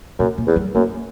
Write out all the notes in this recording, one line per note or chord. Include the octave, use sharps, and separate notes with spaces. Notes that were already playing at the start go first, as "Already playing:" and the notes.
F#2 A#2
A#2
E2
G3
F#2 A#3